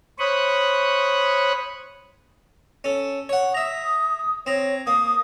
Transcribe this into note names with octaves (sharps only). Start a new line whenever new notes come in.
C5 C#5 B5 C#6 D#6 F#6
C#4 A4
C#5 F#5
E5 A#5 D#6
C4 C#5 A#5
A#3 D#6